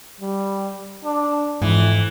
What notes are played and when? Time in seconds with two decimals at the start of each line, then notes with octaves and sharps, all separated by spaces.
0.20 G3
1.05 D4
1.62 F2 G#2 E3